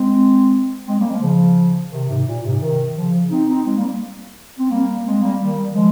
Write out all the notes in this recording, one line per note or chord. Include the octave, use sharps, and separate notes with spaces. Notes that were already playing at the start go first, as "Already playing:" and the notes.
Already playing: G#3 C4
G#3 C4
G3 A#3
F3 G#3
C#3 F3
C3 D#3
G#2 C3
A#2
G#2 C3
C3 D#3
C#3 F3
C4 D#4
C4 D#4
G#3 C4
G3 A#3
C4
G3 A#3
G#3 C4
G3 A#3
D#3 G3
F3 G#3